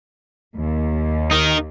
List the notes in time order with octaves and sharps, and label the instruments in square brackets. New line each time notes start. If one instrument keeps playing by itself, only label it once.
[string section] D#2
[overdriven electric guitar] D#4 A#4